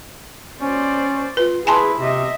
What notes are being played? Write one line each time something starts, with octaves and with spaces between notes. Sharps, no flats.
C#4 C5 D5
F4 B4
E4 G#4 B4 G#5 A5 C6
C3 D#5 E5